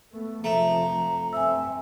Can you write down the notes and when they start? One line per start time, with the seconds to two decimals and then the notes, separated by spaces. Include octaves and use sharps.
0.13 A3 B3
0.44 F1 F3 A3 A#5
1.33 G2 C4 E5 G#5 E6